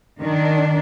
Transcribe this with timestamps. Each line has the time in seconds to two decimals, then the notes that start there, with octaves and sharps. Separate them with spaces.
0.21 D#3 D4